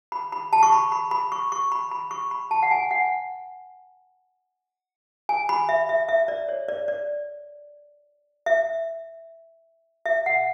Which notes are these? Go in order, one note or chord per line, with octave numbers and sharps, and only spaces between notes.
B5
B5
A5
C#6
B5
B5
B5
C#6
C#6
B5
B5
C#6
B5
A5
F#5
G#5
F#5
G#5
B5
E5
E5
E5
D5
C#5
D5
D5
E5
E5
F#5